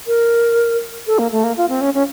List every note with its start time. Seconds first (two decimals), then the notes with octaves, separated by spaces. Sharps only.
0.07 A#4
1.07 A4
1.19 A#3
1.32 A3
1.44 A#3
1.57 F4
1.69 C4
1.81 C#4
1.94 C#4